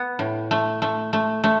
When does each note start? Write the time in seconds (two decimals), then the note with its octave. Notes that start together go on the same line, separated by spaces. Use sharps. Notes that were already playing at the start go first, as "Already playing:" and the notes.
Already playing: B3
0.19 A2
0.51 A3
0.82 A3
1.13 A3
1.44 A3